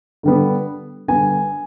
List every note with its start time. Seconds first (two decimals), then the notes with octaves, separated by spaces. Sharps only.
0.23 D3 G3 B3
1.08 D3 G3 B3 G#5